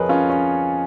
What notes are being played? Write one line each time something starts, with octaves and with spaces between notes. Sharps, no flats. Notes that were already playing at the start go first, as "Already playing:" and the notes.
Already playing: F2 F3 G#4 A#4 B4 C#5 D#5
C#4 F4
C#4